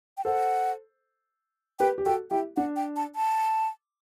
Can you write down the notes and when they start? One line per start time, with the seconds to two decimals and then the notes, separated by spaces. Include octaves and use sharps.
0.17 G5
0.25 A4 C5 F#5
1.79 G4 B4 G5
1.98 G4
2.06 F#4 A4 G5
2.31 E4 G4 G5
2.57 D4 F#5
2.76 G5
2.96 A5
3.16 A5